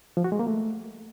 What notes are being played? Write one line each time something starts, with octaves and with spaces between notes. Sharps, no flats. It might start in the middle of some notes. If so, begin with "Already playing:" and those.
F3
F#4
G#3
A#3
A3